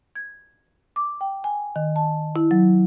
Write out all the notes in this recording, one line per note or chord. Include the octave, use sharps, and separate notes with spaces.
G#6
D6
G5
G#5
D#3
A5
E4
F#3